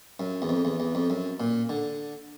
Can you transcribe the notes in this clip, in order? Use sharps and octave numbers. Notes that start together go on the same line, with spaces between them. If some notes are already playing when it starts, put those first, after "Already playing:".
F#2
E2
F2
E2
E2
F2
F#2
A#2
D3